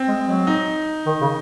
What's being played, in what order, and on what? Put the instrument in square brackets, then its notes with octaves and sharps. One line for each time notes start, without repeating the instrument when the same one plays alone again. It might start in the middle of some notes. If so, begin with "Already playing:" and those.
Already playing: [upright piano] C4
[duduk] G#3
G#3
F#3
[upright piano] D#4
[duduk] D#3
C#3